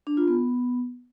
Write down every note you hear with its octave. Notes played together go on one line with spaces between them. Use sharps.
D4
F4
B3